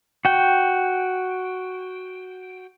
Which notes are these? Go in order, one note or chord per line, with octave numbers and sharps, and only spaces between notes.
F#4 G5